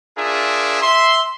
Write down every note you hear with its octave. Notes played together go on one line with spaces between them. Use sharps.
D4 F4 G#4 A#4 E5
E5 C6